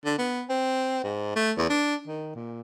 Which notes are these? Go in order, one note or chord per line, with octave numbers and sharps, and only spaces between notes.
D3
B3
C4
G#2
A3
E2
D4
D#3
A#2